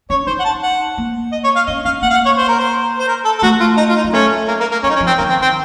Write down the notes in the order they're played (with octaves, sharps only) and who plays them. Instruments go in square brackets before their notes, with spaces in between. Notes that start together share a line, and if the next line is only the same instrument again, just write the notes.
[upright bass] C#4 [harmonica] C#5
[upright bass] D#4 [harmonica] C5
[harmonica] F#5
A5
F#5
[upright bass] A#3
[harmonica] D#5
C#5
F5
[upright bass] C#4 [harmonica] D#5
[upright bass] C#4 [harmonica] F5
[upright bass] A#3 [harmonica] F#5
[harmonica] F5
F#5
C#5
C5
A#4
C5
C5
A#4
A4
A4
[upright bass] A3 [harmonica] F#4
[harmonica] F4
D#4
F4
D#4
[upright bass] F#3
[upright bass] A3 [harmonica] C#4
[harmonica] A#3
A#3
A#3
[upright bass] F#3 [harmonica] C#4
[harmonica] D#4
C#4
[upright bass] F3
[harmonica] C4
[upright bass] D#3 [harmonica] A#3
[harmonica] C4
C4